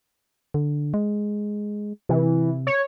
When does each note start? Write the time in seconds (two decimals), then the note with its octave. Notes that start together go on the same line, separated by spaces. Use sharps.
0.54 D3
0.94 G#3
2.09 C3 E3
2.67 C#5